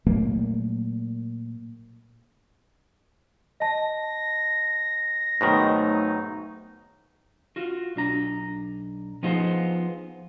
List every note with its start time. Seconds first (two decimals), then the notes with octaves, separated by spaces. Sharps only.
0.06 A#2 F#3 A3 A#3
3.60 D#5 A5 A#6
5.41 G#2 B2 D#3 F#3 A3 D#4
7.56 F4 F#4
7.96 B1 D4 A#5
9.23 F3 B3 D#4 F4 G#4 C5